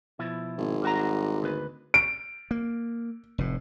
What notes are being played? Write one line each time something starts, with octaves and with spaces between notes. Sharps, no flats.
B2 F3 E4
G#1
G3 F#4 A#5
D2 B4
D7
A#3
F1 A2